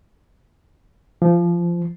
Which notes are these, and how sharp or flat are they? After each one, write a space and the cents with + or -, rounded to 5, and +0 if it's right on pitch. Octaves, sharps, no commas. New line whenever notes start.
F3 -20